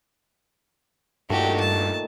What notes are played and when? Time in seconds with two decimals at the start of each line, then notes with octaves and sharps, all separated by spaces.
1.30 G2 A#2 D#3 A3 F#4 G4
1.60 A5